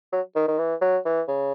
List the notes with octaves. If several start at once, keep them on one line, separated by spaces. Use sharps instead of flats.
F#3
D#3
D#3
E3
F#3
E3
C#3